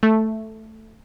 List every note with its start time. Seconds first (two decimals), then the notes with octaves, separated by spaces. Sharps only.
0.03 A3